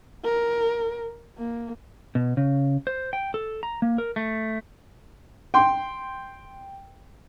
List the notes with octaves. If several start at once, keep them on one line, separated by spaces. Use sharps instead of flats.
A#4
A#3
B2
C#3
C5
G5
A4
A#5
A#3
A#4
A3
G5 C6